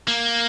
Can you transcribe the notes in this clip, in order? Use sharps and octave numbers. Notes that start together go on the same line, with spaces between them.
A#3